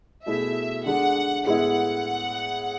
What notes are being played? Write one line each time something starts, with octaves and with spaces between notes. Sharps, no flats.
B2 A3 E4 G#4 E5
D3 G#3 D4 F#5
A2 G#3 B3 E4 F#5